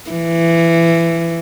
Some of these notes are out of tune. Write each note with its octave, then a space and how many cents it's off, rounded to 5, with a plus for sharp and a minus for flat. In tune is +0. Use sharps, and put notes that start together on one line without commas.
E3 +20